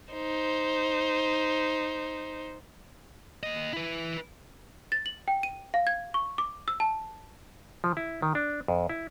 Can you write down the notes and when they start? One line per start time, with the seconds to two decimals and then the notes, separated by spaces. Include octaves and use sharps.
0.13 D#4 C5
3.43 A#3 D#5
3.73 E4 B4
4.92 A6
5.06 F#7
5.28 G5
5.43 D#7
5.74 F5
5.87 G#6
6.14 C#6
6.38 D6
6.68 E6
6.80 A5
7.84 F3
7.97 E4
8.22 D#3
8.35 D4
8.68 F2
8.89 E4